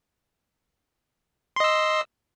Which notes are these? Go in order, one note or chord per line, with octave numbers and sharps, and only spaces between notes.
D#5 C6 E6